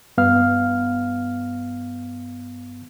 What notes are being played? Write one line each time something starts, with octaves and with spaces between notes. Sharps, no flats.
G2 B3 F5 F6